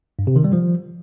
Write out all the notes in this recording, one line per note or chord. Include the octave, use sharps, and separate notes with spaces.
G2
C3
D#3
G3
F3